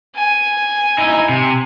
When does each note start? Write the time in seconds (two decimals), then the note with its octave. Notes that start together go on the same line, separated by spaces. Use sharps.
0.15 G#5
0.98 D#4 E4
1.29 C3